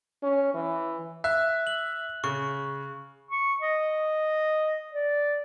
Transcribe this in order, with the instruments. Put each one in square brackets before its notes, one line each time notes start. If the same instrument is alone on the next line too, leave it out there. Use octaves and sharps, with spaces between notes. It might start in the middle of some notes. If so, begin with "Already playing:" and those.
[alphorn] C#4
E3
[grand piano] E5 [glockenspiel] F#6
[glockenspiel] F#7
[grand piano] C#3 [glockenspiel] C#6
[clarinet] C#6
D#5
D5